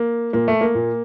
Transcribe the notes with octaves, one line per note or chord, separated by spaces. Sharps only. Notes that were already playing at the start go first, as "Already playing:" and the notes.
Already playing: A#3
A#2 A#3
A3
A#3
A#2